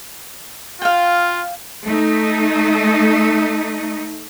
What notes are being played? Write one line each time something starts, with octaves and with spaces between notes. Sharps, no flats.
F4 F5 G5
A3 D#4